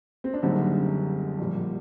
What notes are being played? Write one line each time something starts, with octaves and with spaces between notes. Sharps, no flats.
C4
D4
F#1 F#2 D3 G3 C4 D#4
A#1 A#2 G3